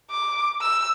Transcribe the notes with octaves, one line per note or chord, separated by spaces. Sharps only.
D6
E6